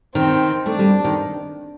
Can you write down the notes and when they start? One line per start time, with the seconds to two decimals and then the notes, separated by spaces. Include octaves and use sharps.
0.15 D#3 C4
0.66 A3 D4
0.79 G3
1.04 D#3